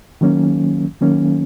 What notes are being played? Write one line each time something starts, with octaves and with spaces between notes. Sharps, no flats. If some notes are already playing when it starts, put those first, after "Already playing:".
D#3 F#3 A#3 C#4
D#3 F#3 A#3 C#4